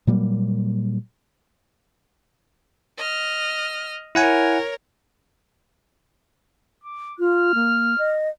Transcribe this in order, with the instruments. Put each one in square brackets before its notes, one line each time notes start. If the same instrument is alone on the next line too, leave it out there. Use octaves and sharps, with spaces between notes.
[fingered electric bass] A#2 F#3 G3 A#3
[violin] D#5 F6
[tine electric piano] E4 F#5 G#5 [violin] A#4 C#5
[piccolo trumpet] D6
[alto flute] F4 [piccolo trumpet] F6
[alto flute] A#3
D#5